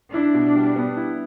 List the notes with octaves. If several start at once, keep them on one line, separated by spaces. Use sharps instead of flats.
D4 E4
B2
G3
B3
E4